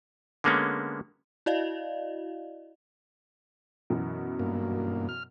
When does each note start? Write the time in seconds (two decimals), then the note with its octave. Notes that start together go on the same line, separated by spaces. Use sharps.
0.44 D3 G#3 A#3 B3 C#4
1.46 E4 F#4 D5 D#5 F5
3.90 F#2 B2 E3
4.39 G2 A#3
5.09 F6